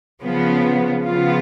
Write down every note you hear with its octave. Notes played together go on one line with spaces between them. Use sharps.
C#3 F3 B3
C#3 F3 B3 F4